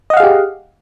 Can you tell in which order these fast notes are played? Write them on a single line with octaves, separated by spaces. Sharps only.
D#5 F#5 F5 G#4 G4